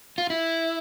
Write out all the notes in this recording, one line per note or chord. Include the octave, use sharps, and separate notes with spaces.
F4
E4